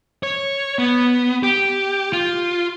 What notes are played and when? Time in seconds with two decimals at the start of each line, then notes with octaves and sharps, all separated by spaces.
0.23 C#5
0.79 B3
1.43 G4
2.13 F4